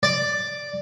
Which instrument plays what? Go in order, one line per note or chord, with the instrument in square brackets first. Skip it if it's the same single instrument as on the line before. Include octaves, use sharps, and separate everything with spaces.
[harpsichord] D5